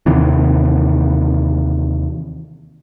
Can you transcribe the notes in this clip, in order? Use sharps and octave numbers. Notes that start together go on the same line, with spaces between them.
D#2 C3 D#3 E3